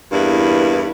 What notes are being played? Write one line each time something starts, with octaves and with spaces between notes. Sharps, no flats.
E2 G2 A#3 E4 B4